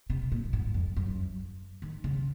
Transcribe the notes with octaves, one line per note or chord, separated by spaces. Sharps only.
C3
A#2
G#2
F2
F#2
D#3
C#3